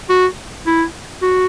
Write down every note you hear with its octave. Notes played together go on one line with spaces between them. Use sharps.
F#4
E4
F#4